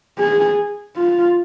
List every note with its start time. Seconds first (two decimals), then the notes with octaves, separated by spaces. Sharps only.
0.19 G#4
0.97 F4